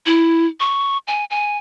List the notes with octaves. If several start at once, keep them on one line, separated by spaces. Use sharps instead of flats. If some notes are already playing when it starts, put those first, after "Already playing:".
E4
C#6
G#5
G#5